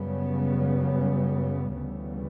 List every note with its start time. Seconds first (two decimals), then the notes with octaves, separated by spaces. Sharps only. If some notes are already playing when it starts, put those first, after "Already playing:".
Already playing: F#2 C#3 G3 B3
1.74 D2 C#3 E3 G3 B3